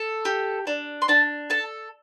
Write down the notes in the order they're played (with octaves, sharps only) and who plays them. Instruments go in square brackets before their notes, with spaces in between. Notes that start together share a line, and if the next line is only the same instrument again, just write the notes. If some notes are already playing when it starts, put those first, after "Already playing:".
Already playing: [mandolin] A4
G4
D4
C6
D4 A5
A4 A5